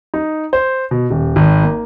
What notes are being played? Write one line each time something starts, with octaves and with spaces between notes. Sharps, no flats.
D#4
C5
B2
D#1
G#1
A#3